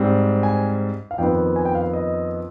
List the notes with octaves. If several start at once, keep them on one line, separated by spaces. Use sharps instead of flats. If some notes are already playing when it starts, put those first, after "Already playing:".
Already playing: G#2 G3 C4
G#5
F5
F2 D#3 B3 G5
G#5
G5
F5
D#5